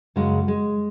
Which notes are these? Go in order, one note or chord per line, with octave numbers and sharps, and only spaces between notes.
F#2 C#3 F#3 G#3
G#3